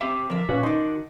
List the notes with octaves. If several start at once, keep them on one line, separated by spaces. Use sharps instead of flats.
C4 G4 E5 D6
D3 F3 A#4 D5 E5
A#2 C#4 F#4 B4
D#3 D4 D#4 C6